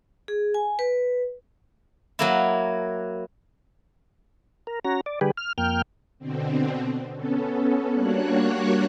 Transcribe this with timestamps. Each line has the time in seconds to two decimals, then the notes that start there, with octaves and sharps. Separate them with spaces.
0.28 G#4
0.54 G#5
0.79 B4
2.19 F#3 A#3 E4
4.67 A#4
4.85 C#4 F#4 A#5
5.06 D5
5.21 D3 G3 G4 G#4 B4
5.37 F6
5.58 F2 A#3 G5 F6
6.19 B2 D3 C4
7.15 B3 C#4 A4
7.92 G3 A#3 D4 F#4 C#5 F#6